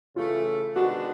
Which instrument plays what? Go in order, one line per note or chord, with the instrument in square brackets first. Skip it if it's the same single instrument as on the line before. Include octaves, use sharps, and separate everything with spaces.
[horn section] C#3 E3 A3 [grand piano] F4
[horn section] C3 D#3 G#3 B3 D4 [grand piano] F#4